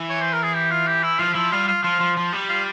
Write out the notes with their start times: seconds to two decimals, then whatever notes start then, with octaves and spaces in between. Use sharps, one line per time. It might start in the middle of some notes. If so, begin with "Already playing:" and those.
Already playing: E3
0.10 C#5
0.21 C5
0.33 A#4
0.43 G#4
0.55 G4
0.71 F4
0.87 G4
1.03 E4
1.19 F3 F4
1.35 F3 E4
1.52 G3 F4
1.67 F4
1.83 F3 F4
2.00 F3
2.17 F3
2.32 G3
2.49 F4